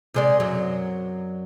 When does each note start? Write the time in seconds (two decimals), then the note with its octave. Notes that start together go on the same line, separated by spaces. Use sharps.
0.14 C3 G#3 D5
0.40 F#2 F#3